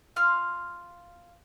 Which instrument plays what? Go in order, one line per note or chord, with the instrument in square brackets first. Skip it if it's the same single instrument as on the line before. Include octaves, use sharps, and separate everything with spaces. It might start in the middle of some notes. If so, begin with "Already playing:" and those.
[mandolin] F4 F5 F6